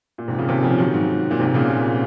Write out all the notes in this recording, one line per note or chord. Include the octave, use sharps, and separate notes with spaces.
A#2
G#2 C3
A#2 C#3
C3 D#3
C#3 F3
D#3 F#3
G#2
A#2
G#2 C3
A#2 C#3
A#2